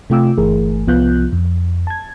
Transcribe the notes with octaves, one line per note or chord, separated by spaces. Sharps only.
C3 A3 F4 G5 D6 E6
G1 E3 A3 G#4 A#4
C2 F3 B3 F4 F#6 G6
F2
A5 G#6